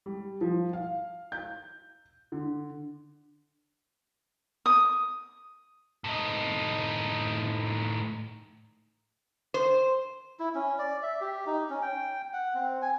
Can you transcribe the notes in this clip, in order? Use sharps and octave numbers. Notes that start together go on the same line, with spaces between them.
G3
F3
F5
G6
D3
D#6
A2 D#4
C5
E4
C#4
D5
E5
G4
D#4
C#4
G5
F#5
C4
G#5